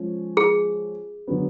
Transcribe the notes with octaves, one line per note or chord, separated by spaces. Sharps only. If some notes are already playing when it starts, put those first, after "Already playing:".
Already playing: F3 G#3 C#4
G#4
D3 F#3 B3